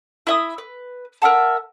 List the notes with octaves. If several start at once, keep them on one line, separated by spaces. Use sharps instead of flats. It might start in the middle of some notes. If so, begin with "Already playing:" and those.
E4 E5 D#6
B4
A#4 E5 F#5 A5